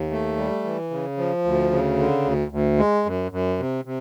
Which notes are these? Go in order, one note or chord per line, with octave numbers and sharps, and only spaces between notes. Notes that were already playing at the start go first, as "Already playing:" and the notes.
Already playing: D#2
A3
G3
E3
C#3
F3
D2
C#3
D3
D2
D2
G#3
F#2
F#2
C3
C3